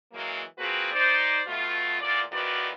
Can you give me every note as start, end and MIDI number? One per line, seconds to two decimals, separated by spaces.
0.12 0.42 52
0.12 0.42 54
0.12 0.42 56
0.12 0.42 58
0.58 0.92 58
0.58 0.92 60
0.58 0.92 65
0.58 0.92 66
0.58 0.92 68
0.58 0.92 71
0.93 1.40 63
0.93 1.40 72
0.93 1.40 74
1.47 2.00 47
1.47 2.00 57
1.47 2.00 65
2.01 2.21 40
2.01 2.21 46
2.01 2.21 65
2.01 2.21 74
2.31 2.70 40
2.31 2.70 51
2.31 2.70 53
2.31 2.70 66
2.31 2.70 71
2.31 2.70 74